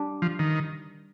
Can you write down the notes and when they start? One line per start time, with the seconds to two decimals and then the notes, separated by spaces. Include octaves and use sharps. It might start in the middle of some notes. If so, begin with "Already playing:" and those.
Already playing: G3 D4 G4
0.22 F3
0.39 D#3